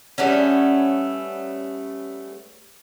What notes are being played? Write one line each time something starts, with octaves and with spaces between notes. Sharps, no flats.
G3 A3 B3 C#4